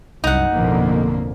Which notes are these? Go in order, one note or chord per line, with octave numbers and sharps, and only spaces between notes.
C2 F#2 D#4 F#5
A1 F2 B2 D3 A#3